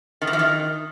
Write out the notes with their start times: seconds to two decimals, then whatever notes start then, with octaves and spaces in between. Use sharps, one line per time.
0.22 D#3
0.27 E3
0.33 F3
0.39 D#3